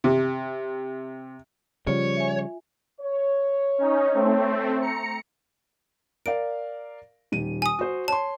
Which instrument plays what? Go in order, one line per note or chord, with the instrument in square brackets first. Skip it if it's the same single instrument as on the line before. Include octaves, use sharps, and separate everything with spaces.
[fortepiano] C3
[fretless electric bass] C#3 F3 G3 [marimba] F4 [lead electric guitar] C#5
[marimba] E5 G#5
[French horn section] C#5
[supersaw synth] C#4 D#4
A3 C4
A#5 C#7
[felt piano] A#4 D5 F5 [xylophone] D7
[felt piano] D#1 D#3 D#7
[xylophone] G#5 D#6
[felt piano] F#4 C5
[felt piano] C#5 C6 [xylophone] A5